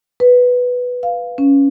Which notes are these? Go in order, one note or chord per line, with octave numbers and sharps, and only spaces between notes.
B4
F5
C#4